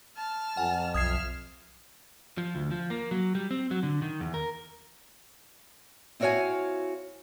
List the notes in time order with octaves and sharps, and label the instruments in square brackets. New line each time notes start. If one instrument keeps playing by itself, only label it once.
[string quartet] A5 F6
[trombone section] F2 [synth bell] F#5 G#5
[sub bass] B1 [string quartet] E5 F6 [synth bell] D#6 G#6 C7
[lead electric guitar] F3
D2
F3
A#3
F#3
G3
C4
F#3
D3
D#3
E2
A#4
[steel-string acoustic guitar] C4 E4 F#4 C#5 F5 G#5